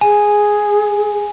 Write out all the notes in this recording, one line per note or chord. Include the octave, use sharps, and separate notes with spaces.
G#4 G#5